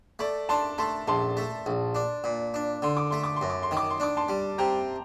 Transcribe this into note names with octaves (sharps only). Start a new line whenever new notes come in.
A3 D5
D4 A5 C6
A3 A5 C6
A#1 A5 C6
A3
A#1
D4
A#2
D4
D3 C6
D6
A3 C6
D6
C6
F#2
D6
C6
D#3
D6
C6
D4 D6
A5 C6
G3
C3 G5 A#5